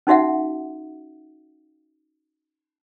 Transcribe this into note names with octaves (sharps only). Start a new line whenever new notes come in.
C#4 D#4 F#4 E5 F#5